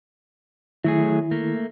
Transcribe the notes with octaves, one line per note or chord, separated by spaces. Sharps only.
D#3 F#3 A3 E4 G#4
A3 A#3